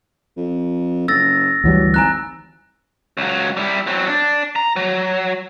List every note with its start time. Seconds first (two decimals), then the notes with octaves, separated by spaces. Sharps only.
0.37 F2
1.08 F#1 E6 A6 A#6
1.64 D2 E3 F#3 G3
1.94 G#1 G#5 A#5 F#6
3.17 C#2 F#3
3.57 G3 E4
3.87 F#3 C4
4.07 D4
4.56 A#5
4.76 F#3